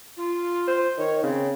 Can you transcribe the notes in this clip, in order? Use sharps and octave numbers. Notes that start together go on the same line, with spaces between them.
F4
C5
D#3 C#5
C#3 C4